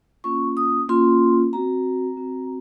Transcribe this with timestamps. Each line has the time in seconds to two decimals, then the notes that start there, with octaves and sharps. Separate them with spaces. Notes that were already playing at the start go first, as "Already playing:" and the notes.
0.24 A#3 C#4 F4 C#6
0.57 D#6
0.89 A#3 C#4 F4 C6
1.53 C4 F#4 A#5
2.17 C4 F#4